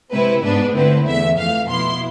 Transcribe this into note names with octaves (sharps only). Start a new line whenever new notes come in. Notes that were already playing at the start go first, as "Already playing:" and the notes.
C3 G#3 C4 E4 B4
G#2 G#3 B3 D4 B4
D3 A3 C4 E4 B4
E2 D3 A3 E5
F2 E3 A3 F5
B2 B3 E4 C6